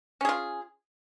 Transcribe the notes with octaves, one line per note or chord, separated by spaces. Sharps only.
C#4 F4 G#4